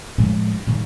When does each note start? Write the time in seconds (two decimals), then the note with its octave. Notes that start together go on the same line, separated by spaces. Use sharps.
0.18 A2 F3 G#3 A3
0.51 G2
0.67 A2 D#3 G3